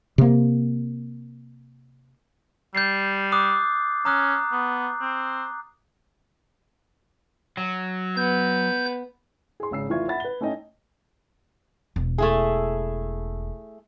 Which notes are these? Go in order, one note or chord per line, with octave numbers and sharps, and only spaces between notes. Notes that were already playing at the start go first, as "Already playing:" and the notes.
C3 A#3
G3 G6 A6 C7
D6 D#6 F#6
C#4 A#5 D#6 F#6
B3
C4
F#3
B3 G6
G#4 C6
G#1 C#3 E6 C7
F1 E3 F4 E5 C#6 G#6
E5 F#5 B5 A6
B4 G7
A3 C#4 D#4 D#5 G5
E1
A3 E4 G#4